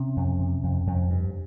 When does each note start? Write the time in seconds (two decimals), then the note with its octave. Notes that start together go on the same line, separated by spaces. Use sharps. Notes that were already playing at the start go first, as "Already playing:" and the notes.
Already playing: C3 C#4
0.16 F2
0.39 C3
0.63 F2
0.87 F2
1.10 G2